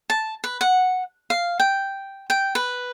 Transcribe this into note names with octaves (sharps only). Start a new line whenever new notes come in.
A5
B4
F#5
F5
G5
G5
B4